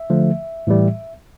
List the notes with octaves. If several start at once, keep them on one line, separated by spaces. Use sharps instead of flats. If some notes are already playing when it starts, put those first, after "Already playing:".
Already playing: E5
D3 F3 A3
A2 E3 G3